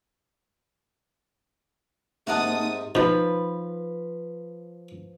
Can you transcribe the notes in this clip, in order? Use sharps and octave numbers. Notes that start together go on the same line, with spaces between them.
G#2 C3 A#3 D#4 A#4 F#5 A5 D#6
B2 F3 D#4 B4